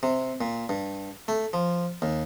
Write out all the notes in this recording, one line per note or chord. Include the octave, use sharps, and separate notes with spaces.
C3
A#2
G2
A3
F3
D#2